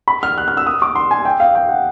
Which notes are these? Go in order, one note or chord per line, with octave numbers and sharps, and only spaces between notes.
B5
F6
F#6
F6
E6
D#6
D6
C6
G#5
G5
F5
G5
F#5